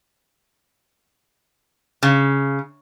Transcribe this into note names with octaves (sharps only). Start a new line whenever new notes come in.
C#3